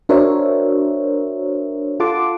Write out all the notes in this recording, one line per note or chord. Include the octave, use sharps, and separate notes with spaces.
D4 F#4 A#4 C5 C#5 E5
F4 A4 F#5 A5 C6 D6